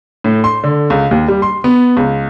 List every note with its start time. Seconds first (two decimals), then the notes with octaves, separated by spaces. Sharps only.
0.24 A2
0.44 C6
0.64 D3
0.90 C#2
1.11 D#2
1.28 G3
1.42 C6
1.64 B3
1.97 C#2